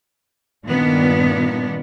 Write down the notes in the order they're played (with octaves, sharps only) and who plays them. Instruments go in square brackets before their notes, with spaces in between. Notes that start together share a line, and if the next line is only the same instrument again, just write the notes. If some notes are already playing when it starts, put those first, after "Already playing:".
[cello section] G2 A#2 D#3 B3 D4